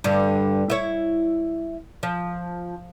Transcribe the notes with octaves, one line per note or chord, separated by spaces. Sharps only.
G2 D3
E4 C#5
F3